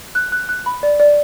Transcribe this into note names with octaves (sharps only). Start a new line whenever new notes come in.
F#6
F#6
F#6
B5
D5
D5